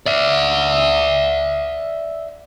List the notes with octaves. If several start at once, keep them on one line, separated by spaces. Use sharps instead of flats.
D5 E5